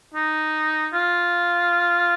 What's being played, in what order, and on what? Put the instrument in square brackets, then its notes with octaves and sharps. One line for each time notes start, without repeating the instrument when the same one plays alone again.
[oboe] D#4
F4